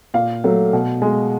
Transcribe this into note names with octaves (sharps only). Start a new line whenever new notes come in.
A#2 F5
F#3 A3
B2
G#3